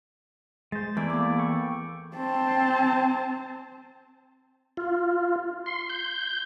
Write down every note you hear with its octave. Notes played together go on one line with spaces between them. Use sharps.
G#3 C5 A6
E2 A3 E4 D5
A#3 D6
A4 G5 C#6
C4 A5
F4
C6
G6